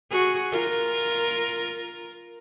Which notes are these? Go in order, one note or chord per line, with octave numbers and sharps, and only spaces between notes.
F#4 G#4
F4 A#4